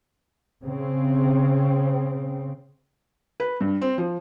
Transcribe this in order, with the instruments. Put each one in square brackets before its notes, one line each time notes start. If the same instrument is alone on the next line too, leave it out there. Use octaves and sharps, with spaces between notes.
[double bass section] C#3 C4
[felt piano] B4
G2
C4
F3